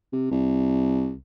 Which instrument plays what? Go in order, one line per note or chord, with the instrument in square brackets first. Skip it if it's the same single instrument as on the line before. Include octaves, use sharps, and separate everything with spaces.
[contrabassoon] C3
C2